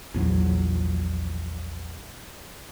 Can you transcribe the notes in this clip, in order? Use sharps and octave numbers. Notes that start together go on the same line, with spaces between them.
A#1 E2 F#3